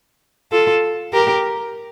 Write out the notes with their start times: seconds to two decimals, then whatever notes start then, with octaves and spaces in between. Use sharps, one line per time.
0.52 F4 A4
1.13 G4 A#4